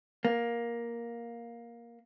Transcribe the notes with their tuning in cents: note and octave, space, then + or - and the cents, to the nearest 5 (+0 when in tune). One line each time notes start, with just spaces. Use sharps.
A#3 +10